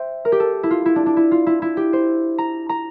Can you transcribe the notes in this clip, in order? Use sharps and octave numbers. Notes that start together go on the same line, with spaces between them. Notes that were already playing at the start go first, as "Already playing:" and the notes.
Already playing: C5 E5 G5
A#4
G4
A4
E4
F4
E4
D4
D4
E4
F4
E4
E4
G4
C5
A#5
A#5